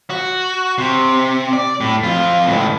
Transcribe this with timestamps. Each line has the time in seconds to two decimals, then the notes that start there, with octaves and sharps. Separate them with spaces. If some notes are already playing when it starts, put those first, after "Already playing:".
0.10 F#4
0.78 C3
1.53 D5
1.81 A2
2.03 F2 F4
2.46 C#2 A2